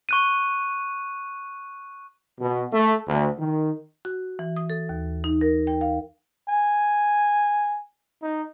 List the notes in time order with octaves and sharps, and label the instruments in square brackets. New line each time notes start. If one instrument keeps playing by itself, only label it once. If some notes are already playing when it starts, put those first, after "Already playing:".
[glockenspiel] C#6 F#6 D#7
[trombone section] B2
A3
D2
D#3
[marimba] F#4
E3
D#6
A4
D#2
D#4
A#4
G5
F5
[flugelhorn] G#5
D#4